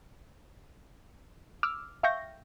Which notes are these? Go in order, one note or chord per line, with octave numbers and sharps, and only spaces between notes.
D6 E6 F6
E5 F5 G5 C#6 G6 A#6